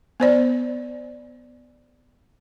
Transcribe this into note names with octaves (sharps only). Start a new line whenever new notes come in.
B3 C5 D5